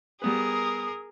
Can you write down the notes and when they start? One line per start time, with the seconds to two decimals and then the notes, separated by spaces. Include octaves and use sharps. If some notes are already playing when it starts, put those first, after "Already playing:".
0.22 G3 B3 G#4 A#4 B4 D#6